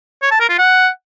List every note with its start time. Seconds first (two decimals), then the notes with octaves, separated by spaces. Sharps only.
0.22 C#5
0.31 A5
0.40 A#4
0.49 F4
0.58 F#5